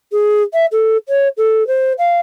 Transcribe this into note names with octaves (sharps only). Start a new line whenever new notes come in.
G#4
E5
A4
C#5
A4
C5
F5